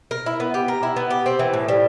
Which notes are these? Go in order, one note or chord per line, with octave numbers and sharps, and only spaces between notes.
A#4
E4
B3
G4
A#4
E4
B3
G4
C4
E3
A2
G3